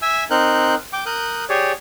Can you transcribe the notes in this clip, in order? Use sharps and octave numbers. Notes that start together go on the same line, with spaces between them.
E5 G#5 E6
C4 D#4 A#4 F#6 G6
G5 D6
A#4 D#6 F#6 G6
G4 G#4 C#5 D5